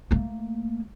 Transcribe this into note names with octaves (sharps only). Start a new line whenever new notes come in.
A3 A#3